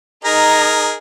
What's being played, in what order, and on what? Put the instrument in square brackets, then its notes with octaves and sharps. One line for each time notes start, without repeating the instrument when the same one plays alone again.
[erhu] D#4 [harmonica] G#4 A#4 [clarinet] A#5